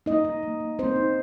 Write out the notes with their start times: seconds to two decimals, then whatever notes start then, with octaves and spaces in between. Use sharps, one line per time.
0.06 A#3 D#4 D#5
0.25 D#4
0.43 A#3
0.60 A#3
0.79 A#3 C4 C5
0.96 D#4